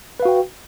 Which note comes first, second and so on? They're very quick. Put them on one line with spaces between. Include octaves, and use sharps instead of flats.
B4 F5 F#4 G5